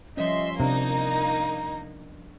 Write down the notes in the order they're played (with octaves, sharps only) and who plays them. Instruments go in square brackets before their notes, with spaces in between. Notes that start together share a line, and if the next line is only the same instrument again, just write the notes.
[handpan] F3 G3 C#4 [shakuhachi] D#5 [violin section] E5 C6
[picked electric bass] C3 [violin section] A#3 D#4 [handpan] D4 [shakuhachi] A#5